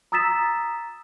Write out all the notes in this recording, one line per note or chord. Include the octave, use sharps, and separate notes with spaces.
A#5 D#6 E6 A6 B6 E7